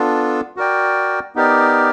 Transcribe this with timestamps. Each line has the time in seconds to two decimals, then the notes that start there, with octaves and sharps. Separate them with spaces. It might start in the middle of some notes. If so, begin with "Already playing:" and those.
Already playing: B3 D4 F4 A4
0.57 F#4 A#4 D5 G5
1.35 B3 D#4 G4 A#4 D5